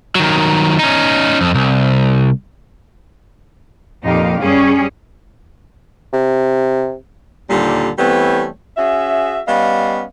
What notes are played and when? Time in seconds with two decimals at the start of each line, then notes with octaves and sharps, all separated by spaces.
0.15 D#3 F#3
0.79 C#4 D#4
1.41 F2
1.54 C2
4.04 F2 A#2 D#4 G4 F5
4.39 F#2 G3 C#4 G#4 C#5
6.13 C3
7.49 D#2 A#2 D3 G3
7.98 E3 G3 A3 B3 C4 C#5
8.77 C#4 F#4 G#4 E5
9.48 G3 B3 C#4 D#5 F5